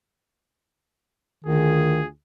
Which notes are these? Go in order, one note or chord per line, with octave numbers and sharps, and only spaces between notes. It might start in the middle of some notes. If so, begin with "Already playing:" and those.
D2 D#3 F4 G#4